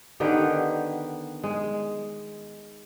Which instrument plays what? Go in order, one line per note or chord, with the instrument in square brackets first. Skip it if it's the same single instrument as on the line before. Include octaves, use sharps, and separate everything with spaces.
[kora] D3 D#3 B3 G4
G#3